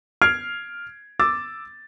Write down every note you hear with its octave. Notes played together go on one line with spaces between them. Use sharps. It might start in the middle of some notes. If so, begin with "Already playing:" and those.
F6 G#6 C7 D7
D6 E6 A6